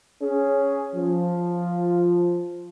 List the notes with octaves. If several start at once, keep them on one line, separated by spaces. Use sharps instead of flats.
C#4 G#4
F3